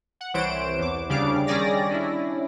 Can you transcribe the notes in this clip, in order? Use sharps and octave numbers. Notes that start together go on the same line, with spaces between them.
F#5
C2 E3 C5 C#5 D7 E7
E2 D6
D2 C#3 G3 D4 F5 D6
D#3 G3 C#4 G#4 D5 A#6
C#4 D4 E4